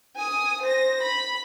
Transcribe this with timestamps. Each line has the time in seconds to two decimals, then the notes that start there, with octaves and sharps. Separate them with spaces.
0.16 G#5 D#6
0.62 C5 A#6
1.02 B5